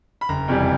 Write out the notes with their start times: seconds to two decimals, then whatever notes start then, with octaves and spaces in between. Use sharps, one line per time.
0.21 B5
0.29 F#1 A#5
0.48 F2 C3 E3 G3